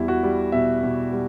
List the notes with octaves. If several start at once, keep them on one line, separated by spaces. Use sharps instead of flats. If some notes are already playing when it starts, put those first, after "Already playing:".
Already playing: E2 G3 E4
F#4
G3
B2 E5
B2
G3